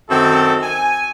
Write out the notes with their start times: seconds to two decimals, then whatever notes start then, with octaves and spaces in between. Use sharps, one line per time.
0.10 F#2 D#3 C4 A4
0.63 G#5